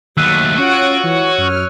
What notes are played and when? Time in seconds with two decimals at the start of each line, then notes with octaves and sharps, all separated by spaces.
0.17 D#2 F#3 A3 E6 F#6 D#7
0.58 C#4 F4 F#4 C#5 F#5 D7
1.03 E3 C#5
1.38 F#2 F6